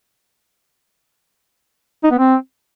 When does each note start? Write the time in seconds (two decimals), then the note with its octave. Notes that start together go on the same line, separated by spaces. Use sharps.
2.04 D#4
2.11 B3
2.19 C4